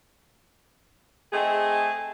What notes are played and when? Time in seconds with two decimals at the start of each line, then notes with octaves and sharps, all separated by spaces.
1.32 A3 C4 D#4 G#4